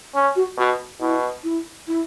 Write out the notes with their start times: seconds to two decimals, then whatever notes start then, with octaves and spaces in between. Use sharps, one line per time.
0.15 C#4
0.36 F#4
0.57 B2 F#4
1.00 B2 E4
1.44 E4
1.88 E4